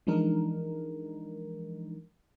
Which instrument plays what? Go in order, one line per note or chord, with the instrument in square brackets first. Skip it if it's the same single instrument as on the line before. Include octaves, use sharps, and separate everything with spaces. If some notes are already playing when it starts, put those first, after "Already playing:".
[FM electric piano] E3 F3 G#3 D4 D#4 A#4